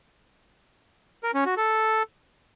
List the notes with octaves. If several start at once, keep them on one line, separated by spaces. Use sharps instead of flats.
A#4
C#4
F#4
A4